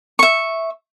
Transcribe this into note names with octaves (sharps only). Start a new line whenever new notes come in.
E5 C#6